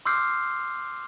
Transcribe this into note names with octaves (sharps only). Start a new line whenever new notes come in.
C6 D6 E6 F6 G6 C7